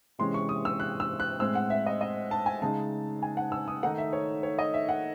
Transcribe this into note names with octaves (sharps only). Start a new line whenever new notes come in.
C3 E3 G#3 C#4 C6
C#6
D#6
E6
F#6
E6
F#6
A2 G#3 C4 E6
F#5
E5
D#5
D#5
A5
G#5
C#3 G#3 D#4 A5
G#5
F#5
E6
D#6
D#3 A3 D#4 F#5
E5
C#5
C#5
D#5
E5
F#5